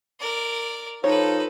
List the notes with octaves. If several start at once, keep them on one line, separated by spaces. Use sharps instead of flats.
A#4 D5
F3 D#4 A4 B4 C#5